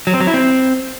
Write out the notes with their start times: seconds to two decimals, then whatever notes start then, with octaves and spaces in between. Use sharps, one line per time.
0.07 F#3
0.14 C4
0.20 F#3
0.27 E4
0.34 C4